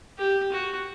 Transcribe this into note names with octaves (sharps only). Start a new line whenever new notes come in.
G4
F#4